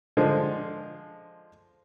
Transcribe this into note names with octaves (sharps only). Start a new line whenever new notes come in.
D3 F3 G#3